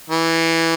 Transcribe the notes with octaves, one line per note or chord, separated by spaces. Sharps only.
E3